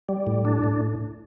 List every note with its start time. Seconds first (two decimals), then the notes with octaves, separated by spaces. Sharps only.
0.09 G3
0.27 A2
0.45 D4
0.64 A2